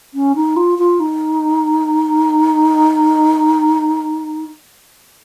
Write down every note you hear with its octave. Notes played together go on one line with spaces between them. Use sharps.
C#4
D#4
F4
F4
D#4